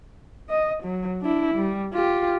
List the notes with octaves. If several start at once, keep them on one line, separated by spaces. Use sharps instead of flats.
D#5
F#3
D4 E4
G3
F4 G4